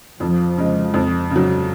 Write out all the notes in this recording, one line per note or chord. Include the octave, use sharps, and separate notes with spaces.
F2 F3
C#3 G#3
F2
C#3
F#3